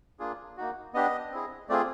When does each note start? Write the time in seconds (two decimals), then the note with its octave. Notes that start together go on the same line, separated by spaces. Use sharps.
0.19 A#3 D4 F4 G#4
0.57 A#3 D#4 F#4
0.94 B3 D4 G4 D#5
1.31 C4 E4 G#4
1.69 A3 C4 F4 G#4 D5